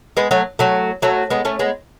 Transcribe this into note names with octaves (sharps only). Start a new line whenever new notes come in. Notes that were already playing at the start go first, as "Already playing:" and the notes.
G#3 B3
F#3 A3
F#3 A3
F#3 A3
G#3 B3
A3 C#4
G#3 B3